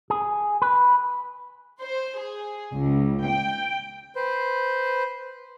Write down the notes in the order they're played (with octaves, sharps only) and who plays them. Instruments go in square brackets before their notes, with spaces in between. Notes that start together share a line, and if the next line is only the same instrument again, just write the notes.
[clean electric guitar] G#4
B4
[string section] C5
G#4
C#2
G5
[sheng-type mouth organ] B4 C5